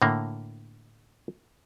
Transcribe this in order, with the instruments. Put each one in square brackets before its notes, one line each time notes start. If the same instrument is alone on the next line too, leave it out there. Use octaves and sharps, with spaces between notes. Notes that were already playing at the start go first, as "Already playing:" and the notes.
[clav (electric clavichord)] A2 D3 A#3